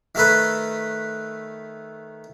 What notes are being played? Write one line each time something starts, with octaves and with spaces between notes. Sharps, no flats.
D#3 A3 A4 B4